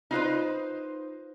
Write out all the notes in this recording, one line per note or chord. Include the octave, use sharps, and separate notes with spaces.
D#4 F4 B4 C5